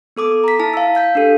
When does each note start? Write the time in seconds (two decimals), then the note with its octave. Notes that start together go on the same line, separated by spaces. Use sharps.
0.16 B3 A4 D6 D#6
0.44 A#5 B6
0.59 E4 A5
0.74 F5 E6
0.95 F5 G6 B6
1.15 D4 G4 A4